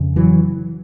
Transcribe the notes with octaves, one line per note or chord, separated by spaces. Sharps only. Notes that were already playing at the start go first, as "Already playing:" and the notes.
Already playing: F2 C#3
E3 F#3